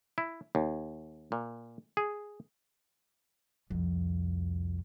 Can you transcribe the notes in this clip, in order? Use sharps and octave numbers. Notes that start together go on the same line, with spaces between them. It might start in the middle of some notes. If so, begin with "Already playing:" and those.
E4
D#2
A#2
G#4
C2 F2